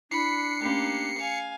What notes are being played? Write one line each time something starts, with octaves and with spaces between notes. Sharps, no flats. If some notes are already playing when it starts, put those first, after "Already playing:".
D4 E4 B5 C7 C#7
A3 A#3 C#4 G4
F5 G#5